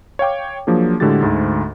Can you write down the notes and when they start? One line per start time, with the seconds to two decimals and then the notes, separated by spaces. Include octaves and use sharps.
0.19 C#5 F5 G5 D6
0.67 F3 F#3 A#3 D4 G#4
1.00 A2 D3 G#3 F#4 G4 A6
1.22 D2 G#2